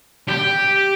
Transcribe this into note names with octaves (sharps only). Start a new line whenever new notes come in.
G4